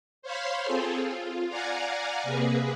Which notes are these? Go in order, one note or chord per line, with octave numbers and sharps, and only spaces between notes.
C5 C#5 F5 B5 C6
C4 F4 G#4 A4
F4
D5 F5 F#5 G#5 A#5
C3 A#3 G#4 B4